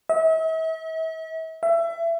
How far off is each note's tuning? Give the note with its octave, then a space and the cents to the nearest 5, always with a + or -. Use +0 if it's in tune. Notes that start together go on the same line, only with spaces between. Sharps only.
E5 -40
E5 +25